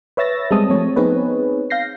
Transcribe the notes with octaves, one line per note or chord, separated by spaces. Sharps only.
B4 C#5 E5 E6 A6 A#6
G3 G#3 C4 A5 D#6
F3 A3 C4 C#5
B3 C4 D#4 G#4 B4 C#5
F5 G6 A#6 C7